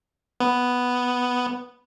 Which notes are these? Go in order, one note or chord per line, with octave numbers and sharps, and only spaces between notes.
B3